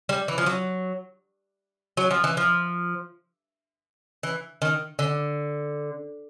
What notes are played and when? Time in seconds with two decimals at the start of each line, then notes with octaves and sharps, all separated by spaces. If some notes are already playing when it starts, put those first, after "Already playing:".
0.09 G3
0.28 E3
0.38 F3
0.46 F#3
1.97 F#3
2.11 F3
2.24 E3
2.37 F3
4.23 E3
4.62 D#3
4.99 D3